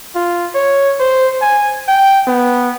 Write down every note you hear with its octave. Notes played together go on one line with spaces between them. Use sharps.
F4
C#5
C5
G#5
G5
B3